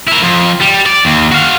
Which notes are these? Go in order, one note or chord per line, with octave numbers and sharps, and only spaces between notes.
E4 A#4
F2
G3
D5
D#2
F#4 F5